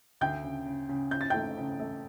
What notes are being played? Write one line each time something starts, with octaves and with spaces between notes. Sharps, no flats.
D2 G5 G6
C#3
C#3
C#3
C#3 G6
A6
A3 G5 G6
C#3
A3